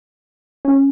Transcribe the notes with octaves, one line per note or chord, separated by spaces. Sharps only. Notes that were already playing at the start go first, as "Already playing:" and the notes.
C#4